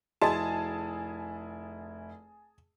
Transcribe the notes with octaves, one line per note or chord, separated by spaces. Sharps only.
F1 E4 F#4 G#4 D#5 A5